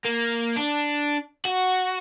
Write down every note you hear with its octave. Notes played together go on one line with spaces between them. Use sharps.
A#3
D4
F#4